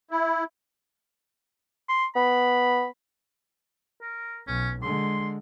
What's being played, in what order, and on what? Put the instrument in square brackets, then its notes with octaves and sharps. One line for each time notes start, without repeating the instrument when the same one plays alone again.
[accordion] E4
[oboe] C6
[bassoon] B3 [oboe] B5
[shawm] A#4
[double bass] B1 [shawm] C#4
[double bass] D3 G#3 [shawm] C6